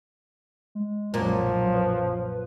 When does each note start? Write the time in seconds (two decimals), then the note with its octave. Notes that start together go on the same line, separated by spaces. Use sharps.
0.75 G#3
1.14 B1 F#2 A#2 F3 F#3
1.74 B4